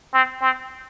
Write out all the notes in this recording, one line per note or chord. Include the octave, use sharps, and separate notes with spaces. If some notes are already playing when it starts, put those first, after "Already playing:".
C4
C4